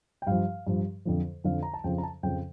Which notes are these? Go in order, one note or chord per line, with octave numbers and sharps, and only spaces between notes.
G5
G2 F3 F5
G2 F3
F2 D3 F3
F2 D3 F3 F5
A#5
A5
F2 C#3 F3 G5
A#5
A5
F2 C#3 F3 G5